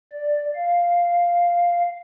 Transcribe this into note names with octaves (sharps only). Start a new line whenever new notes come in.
D5
F5